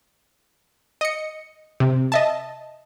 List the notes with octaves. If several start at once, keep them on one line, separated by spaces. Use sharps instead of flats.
D#5 C#7
C3
D#5 E5 A5